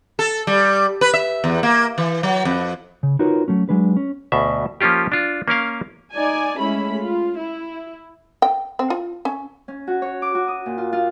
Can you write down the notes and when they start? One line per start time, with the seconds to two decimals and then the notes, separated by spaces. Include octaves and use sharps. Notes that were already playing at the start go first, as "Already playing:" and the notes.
0.19 A4
0.47 G3
1.01 B4
1.14 E5
1.44 E2
1.63 A#3
1.98 E3
2.23 F#3
2.45 F2
3.03 C#3
3.19 D#4 F4 F#4 A#4 B4 C#5
3.48 F#3 A3 C#4
3.69 F#3 G#3 D4 B4
3.97 C#4
4.32 D2 B2 E5
4.81 F3 A#3 C#4 F4 G4
5.12 D4 F4
5.48 A#3 C#4 A#4 F5
6.14 D#4 D5 G#5
6.58 G#3 A3 C#4 E4 B5
7.01 F4
7.38 E4
8.42 G5
8.79 C4
8.90 F4
9.25 C#4
9.68 C#4
9.87 F#4
10.02 C#5
10.22 D6
10.35 F#4
10.48 D#6
10.66 A#2
10.78 F4
10.93 F4